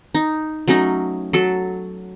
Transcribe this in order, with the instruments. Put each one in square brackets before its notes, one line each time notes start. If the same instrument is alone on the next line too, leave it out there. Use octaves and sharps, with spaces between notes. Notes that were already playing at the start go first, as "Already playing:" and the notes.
[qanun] D#4
F#3 A3 C#4 D#4
F#3 A4